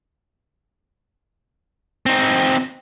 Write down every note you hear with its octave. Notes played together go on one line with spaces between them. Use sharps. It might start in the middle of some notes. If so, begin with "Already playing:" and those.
C4 D#4